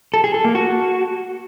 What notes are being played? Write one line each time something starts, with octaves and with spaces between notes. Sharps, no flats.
A4
G#4
A4
A#3
F#4